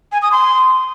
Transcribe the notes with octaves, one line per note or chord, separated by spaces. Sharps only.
G#5
D#6
C6